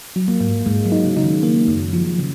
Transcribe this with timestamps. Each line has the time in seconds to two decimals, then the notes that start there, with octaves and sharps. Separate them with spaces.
0.16 F#3
0.28 A#3
0.41 G#2
0.66 G#2 G#3
0.86 F#3
0.92 D#4
1.04 C#3
1.17 C#3 D#4
1.24 D#3
1.43 A#3
1.68 F#2
1.93 F3
2.19 C#3